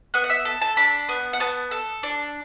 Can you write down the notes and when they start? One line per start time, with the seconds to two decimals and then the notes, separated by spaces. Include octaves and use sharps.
0.14 B3 F#5
0.24 F#5
0.30 E5
0.45 A4
0.61 A5
0.77 D4 B5
1.09 B3
1.33 F#5
1.40 B3 A5
1.71 A4
2.03 D4